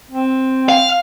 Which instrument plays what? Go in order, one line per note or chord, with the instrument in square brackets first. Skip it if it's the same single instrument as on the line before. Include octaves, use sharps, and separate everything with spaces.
[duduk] C4
[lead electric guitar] F5